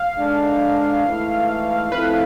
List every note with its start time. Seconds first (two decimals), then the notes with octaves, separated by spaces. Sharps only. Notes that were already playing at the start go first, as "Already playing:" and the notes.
Already playing: F5
0.16 G#2 G#3 D4 A4
1.04 G#2 E3 A3 E4
1.92 F3 A3 C4 E4 B4